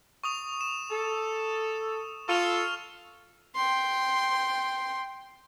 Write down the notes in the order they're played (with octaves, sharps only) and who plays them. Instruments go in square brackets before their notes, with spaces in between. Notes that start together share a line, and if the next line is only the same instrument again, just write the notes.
[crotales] C#6 D#6 F7
E7
[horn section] A4
[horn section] F4 A4 [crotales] C#6 F6 F7
[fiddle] G5 C6